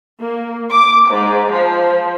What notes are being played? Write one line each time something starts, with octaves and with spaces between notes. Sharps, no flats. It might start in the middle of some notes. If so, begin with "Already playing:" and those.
A#3
D6
G#2
F3